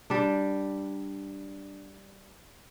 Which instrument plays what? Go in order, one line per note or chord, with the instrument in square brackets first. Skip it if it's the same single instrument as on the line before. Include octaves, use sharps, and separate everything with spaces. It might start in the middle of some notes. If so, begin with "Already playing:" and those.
[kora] G3 D4